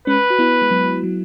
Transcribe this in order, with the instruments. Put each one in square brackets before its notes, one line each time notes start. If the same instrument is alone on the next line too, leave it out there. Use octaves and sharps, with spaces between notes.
[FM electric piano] G#3 C#4 [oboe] B4
[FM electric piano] F#4
B3 E4
G#3
F#3 B3
F#3